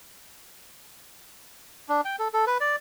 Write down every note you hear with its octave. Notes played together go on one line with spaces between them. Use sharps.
D4
G5
A4
A4
B4
D5